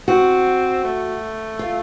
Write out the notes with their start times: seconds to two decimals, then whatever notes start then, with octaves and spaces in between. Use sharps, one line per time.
0.08 C4 F#4
0.84 A3
1.59 F4